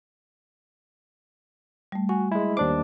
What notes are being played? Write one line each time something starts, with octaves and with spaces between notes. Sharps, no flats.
G3 A3
F#4 G#5
G#3 E4
D#2 D4 C5 D6